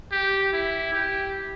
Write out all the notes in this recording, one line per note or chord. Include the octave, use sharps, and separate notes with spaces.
G4
E4
G4